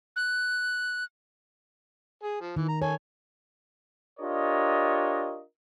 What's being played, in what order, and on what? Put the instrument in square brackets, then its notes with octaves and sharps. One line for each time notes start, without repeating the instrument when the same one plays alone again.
[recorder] F#6
[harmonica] G#4
F3
[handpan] D#3 [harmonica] E3
[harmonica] A#5
[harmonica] A4 G#5 [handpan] C#5
[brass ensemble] D4 F4 G4 A#4 C#5 D#5